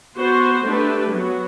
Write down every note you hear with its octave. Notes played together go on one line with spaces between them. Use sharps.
B3 F#4 C5
A3 D4 G4 B4
F#3 B3 F#4